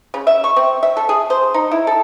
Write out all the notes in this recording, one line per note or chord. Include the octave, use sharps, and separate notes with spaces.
C#3
E5
C#6
C4
E5
A4
G#4
C5
D#4
E4
A4